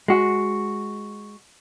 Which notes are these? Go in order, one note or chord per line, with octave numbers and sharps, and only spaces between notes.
G#3 F#4